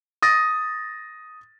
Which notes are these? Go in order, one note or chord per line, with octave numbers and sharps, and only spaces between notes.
D#6 A6 A#6